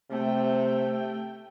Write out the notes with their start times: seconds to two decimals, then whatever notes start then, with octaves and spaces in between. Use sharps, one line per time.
0.10 C3 A3 G5